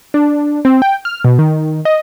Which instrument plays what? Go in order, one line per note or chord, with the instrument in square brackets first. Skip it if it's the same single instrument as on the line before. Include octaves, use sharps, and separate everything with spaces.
[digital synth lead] D4
C4
G5
F6
B2
D#3
D#5